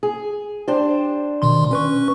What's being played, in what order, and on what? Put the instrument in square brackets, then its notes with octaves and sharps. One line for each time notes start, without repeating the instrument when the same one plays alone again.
[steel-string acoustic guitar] G#4
D4 G4 C5
[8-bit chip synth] B2 D#3 C6
C#4 B4 C#6